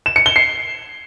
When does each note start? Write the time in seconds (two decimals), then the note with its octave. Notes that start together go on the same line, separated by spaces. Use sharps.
0.06 E7
0.16 C#7
0.26 G7
0.36 C7